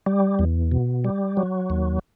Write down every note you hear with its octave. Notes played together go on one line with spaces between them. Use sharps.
G3
E2
B2
G3
F#3
D#2